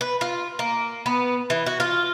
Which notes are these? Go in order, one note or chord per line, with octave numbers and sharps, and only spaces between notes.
B4
F4
A#3
B3
E3
F#4
F4